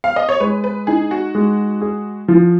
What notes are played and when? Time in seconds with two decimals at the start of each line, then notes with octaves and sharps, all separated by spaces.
0.04 F5
0.16 D#5
0.29 C#5
0.40 G#3 B4
0.64 B4
0.87 D#4 G#4
1.11 F#4
1.35 G#3
1.81 G#4
2.28 F3